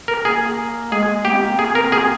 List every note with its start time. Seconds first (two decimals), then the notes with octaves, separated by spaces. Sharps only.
0.08 A#4
0.25 A#3 G#4
0.92 G#3 G#4
1.25 A#3 G4
1.32 C4
1.40 A#3
1.59 A#3 G#4
1.75 C4 A#4
1.92 A#3 G#4